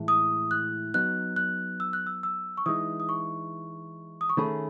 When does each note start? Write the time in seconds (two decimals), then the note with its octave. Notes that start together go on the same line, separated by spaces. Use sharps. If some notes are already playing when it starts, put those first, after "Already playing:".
Already playing: A2 E3 G#3
0.08 D#6
0.51 F#6
0.94 F#3 B3 D#4 F#6
1.36 F#6
1.80 E6
1.93 F#6
2.06 E6
2.23 E6
2.57 C#6
2.66 E3 G#3 D#4 D#6
3.00 D#6
3.09 C#6
4.21 D#6
4.29 C#6
4.37 D#3 A3 C#4 G#4 B5